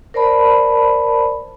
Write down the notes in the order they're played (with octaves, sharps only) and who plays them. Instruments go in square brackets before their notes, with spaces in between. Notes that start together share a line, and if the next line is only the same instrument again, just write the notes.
[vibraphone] A#4 C5 D5 A5 B5